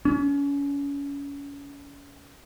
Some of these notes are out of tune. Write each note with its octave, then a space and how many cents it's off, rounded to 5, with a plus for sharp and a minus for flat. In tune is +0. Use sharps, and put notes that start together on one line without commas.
C#4 +30